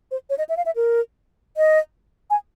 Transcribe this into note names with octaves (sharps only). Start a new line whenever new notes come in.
C5
C#5
D#5
E5
F5
E5
A#4
D#5
G#5